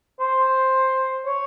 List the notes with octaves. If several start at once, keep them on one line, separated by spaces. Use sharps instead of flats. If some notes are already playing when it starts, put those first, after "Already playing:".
C5
C#5